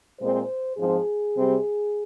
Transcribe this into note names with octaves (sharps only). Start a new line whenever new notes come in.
A#2 G#3 C4 C5
G#2 F3 C4 G#4
C3 G3 C4